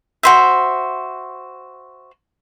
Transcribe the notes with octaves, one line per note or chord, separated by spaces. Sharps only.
F#4 C5 E5